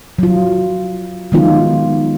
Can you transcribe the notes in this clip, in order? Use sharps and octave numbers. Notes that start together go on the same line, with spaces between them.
F#3 F4
D#3 F#3 G#3 B3 D#4 F4